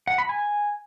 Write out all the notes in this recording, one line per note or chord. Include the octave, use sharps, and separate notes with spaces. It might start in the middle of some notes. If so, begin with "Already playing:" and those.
F#5
B5
G#5